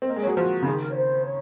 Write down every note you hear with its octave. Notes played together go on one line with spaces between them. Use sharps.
C4
A#3 D#5
G#3
C#5
F#3
G#4
F3 F#4
C#3
D#3 G#4
A#4
C#5
C5
C#5